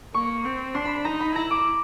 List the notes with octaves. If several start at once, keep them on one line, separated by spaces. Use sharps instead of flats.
A#3 C#6
C4
D4 C6
B5
B5
D#4 A#5
B5
E4 A#5
D6